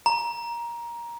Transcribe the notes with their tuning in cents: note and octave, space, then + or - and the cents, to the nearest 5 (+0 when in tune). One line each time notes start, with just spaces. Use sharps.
A#5 +15